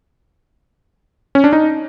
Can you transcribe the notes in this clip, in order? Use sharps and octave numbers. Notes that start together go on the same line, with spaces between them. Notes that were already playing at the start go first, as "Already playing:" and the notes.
C#4
D4
D#4